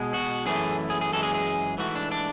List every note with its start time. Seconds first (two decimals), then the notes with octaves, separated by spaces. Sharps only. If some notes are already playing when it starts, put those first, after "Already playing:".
Already playing: B2 G#3
0.14 F#4
0.46 F#2 E3 A3 G#4
0.90 G#4
1.01 G#4
1.13 F#2 E3 G#3 A4
1.23 G#4
1.34 G#4
1.78 G#2 E3 A3 F#4
1.95 D4
2.11 D4